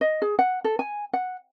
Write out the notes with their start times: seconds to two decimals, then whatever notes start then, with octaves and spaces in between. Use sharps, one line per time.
0.01 D#5
0.22 G#4
0.39 F#5
0.64 A4
0.79 G#5
1.13 F#5